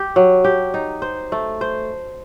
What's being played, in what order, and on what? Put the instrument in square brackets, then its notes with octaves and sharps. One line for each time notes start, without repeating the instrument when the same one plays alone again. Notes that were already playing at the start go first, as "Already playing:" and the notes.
Already playing: [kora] G4
F#3
G4
D#4
C5
A3
C5